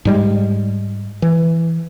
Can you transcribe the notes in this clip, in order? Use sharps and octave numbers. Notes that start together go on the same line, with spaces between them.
G#2 G3 G#3
E3